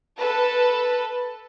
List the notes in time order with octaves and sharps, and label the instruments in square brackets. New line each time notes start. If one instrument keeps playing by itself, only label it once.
[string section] A4 B4 A5